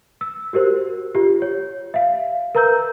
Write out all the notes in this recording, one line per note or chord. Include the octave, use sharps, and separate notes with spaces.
E6
F#4 G4 A#4 C5
F4 G4
C#5
E5 F5
A#4 B4 A#5 E6 G6